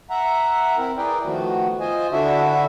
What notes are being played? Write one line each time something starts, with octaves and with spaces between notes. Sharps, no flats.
E5 F#5 A#5
C4 E4 A#4
E4 G#4 A#4 B4 D5 G5
D#3 F3 A3 B3 F#4
F4 C5 D#5 G#5
D3 D4 E4 F#4 E5